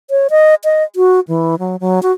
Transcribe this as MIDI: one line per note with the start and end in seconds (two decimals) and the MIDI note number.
0.10 0.28 73
0.30 0.55 75
0.64 0.83 75
0.96 1.20 66
1.28 1.55 52
1.59 1.76 54
1.80 1.99 54
2.02 2.11 66